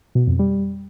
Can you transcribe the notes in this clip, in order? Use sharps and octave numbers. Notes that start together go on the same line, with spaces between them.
B2
F2
G3